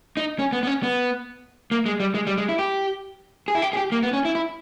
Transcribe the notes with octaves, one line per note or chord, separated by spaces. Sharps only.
D#4
C#4
B3
B3
C#4
B3
A#3
G#3
G3
G#3
G3
G#3
E4
G4
G#4
E4
G4
G#4
G4
A#3
B3
C#4
E4
E4